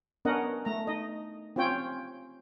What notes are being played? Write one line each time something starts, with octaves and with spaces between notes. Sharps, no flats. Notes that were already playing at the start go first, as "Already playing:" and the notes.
B3 C#4 D4 A#4 D#5 F#5
A3 A#5
D#4 D#5
C4 C#4 F4 C#5 G5